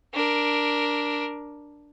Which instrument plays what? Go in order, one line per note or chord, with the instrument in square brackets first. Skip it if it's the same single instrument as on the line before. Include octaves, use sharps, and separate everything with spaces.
[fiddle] D4 A#4